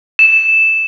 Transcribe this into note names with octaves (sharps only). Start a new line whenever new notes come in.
E7